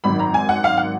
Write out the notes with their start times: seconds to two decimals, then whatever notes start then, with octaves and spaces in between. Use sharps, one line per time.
0.04 G#1 F#2 D#3 B5
0.19 A#5
0.34 G#5
0.49 F#5
0.64 F5
0.77 F#5